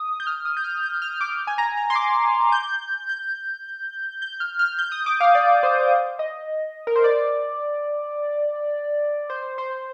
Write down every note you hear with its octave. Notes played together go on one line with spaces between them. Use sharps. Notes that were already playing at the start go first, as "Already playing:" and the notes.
Already playing: D#6
G6
F6
D#6
G6
F6
G6
F6
D6
G#5
A#5
A#5
C6
D6
G6
G6
G6
F6
F6
G6
D#6
D6
F5
D5
C5
D#5
A#4
C5
D5
C5
C5